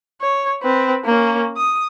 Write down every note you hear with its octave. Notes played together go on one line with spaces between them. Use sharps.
C#5
C4 B4
A#3 C#4
D#6